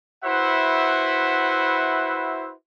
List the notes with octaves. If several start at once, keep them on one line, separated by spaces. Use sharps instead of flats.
E4 F#4 B4 C5 E5 F#5